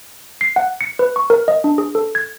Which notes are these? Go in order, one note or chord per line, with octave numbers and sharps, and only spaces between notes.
C7
F#5
C#7
B4
C#6
A#4
D#5
D4
G#4
A4
G#6